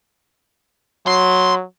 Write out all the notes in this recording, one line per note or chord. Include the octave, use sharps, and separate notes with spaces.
F#3 C6